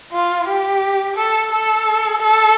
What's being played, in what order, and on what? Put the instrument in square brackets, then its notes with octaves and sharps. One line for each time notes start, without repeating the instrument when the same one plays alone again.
[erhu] F4
G4
A4
A4
A4